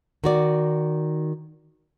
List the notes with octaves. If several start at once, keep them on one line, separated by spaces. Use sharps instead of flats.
D#3 F#4 D5